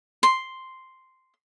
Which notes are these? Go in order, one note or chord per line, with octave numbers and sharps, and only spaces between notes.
C6